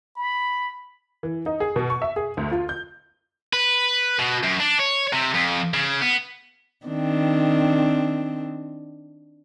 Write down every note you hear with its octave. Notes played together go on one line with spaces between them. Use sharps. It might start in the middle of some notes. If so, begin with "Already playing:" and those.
B5
E3
D#4
G#4
B2
C#6
E5
G#4
D2
F4
G6
B4
B2
F#2
D4
C#5
C3
F2
C#3
B3
D#3 C4 D4